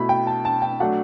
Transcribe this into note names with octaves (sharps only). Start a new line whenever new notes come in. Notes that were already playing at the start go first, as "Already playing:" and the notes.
Already playing: B2 A3 E4 B5
G5
A5
A5
G5
F#3 A3 D4 F#5